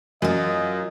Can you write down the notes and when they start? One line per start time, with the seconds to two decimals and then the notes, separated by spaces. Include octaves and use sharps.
0.22 F#2 F#3 F4 D#5